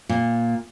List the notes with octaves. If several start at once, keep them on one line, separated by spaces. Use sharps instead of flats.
A#2